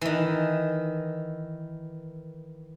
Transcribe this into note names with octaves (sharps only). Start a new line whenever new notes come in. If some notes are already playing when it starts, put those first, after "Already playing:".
D#3 E3